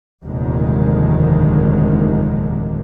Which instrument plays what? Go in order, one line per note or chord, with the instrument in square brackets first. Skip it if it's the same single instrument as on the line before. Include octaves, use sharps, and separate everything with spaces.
[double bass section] F1 D#2 A#2 D3 D#3 G#3